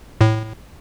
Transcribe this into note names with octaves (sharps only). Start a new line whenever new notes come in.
A2